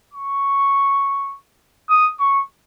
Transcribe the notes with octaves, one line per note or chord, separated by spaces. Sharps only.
C#6
D#6
C#6